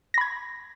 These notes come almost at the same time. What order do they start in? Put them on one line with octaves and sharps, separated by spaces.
A#6 B5 G#6